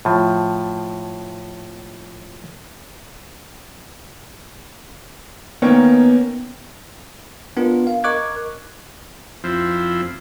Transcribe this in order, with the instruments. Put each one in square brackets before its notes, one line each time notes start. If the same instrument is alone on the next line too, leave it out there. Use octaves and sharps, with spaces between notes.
[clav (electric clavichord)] A2 F3
[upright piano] D#3 A#3 C#4 [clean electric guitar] B3
[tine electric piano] B3 D4 F4 A#4
F5
A#4 D#5 C#6 D6 F#6 G#6
[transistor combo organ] F2 F3 C4 E4